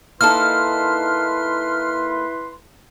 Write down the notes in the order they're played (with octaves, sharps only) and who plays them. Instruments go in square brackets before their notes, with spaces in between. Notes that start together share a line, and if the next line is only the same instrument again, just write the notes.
[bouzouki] A#3 D#4 A4 [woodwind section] E4 B4 C6 [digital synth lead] F6